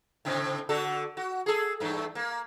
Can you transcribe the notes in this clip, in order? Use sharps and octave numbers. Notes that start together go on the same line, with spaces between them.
A2 C#3 C4
D3 F#4 A4
F#4
G#4 A4
E2 G2 A3
A#3